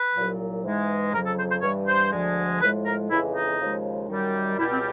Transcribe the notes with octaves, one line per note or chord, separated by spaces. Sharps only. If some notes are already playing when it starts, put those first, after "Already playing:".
Already playing: B4
C2 A#2 F#3
G#2 E3 G#3
F2 C#3 F#3 A#4
A4
C5
C5
G2 E3 G3 C#5
C5
D2 D3 F3 G#3
A2 F3 G#3 B4
A#4
F2 C#3 E3 G#3 E4
D#4
D#2 C#3 F3 G#3
F#2 D#3 G3
C#2 B2 G3 E4
C4